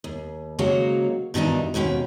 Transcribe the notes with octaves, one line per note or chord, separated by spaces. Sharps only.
D#2
G#2 C#3 F#3 A#3 F#4 C#5
G2 B2 D#3 E3 D4 D#4
D#2 G#2 B2 C#4 G5